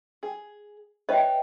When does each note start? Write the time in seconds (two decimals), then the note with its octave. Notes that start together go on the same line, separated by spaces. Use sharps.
0.23 G#4
1.09 B4 C#5 D#5 E5 G5